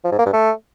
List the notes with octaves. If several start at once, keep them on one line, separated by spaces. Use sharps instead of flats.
F3
G#2
A#3
G2
A3